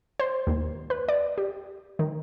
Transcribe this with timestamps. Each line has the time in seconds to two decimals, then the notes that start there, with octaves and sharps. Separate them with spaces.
0.20 C5
0.47 D#2
0.90 B4
1.08 D5
1.38 G4
1.99 D#3